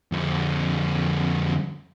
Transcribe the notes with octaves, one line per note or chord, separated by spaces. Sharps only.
F2 D3